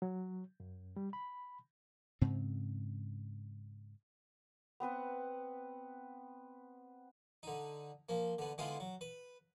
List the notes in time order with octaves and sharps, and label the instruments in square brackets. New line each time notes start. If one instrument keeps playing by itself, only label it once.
[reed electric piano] F#3
F#2
G3
B5
[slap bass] G#2 C#3 C4
[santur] B3 C4 B4 F#5
[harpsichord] D3 D#4
F3 A#3
D3 B3
D3 G#3 B3 E4 F4 C6
F#3
B4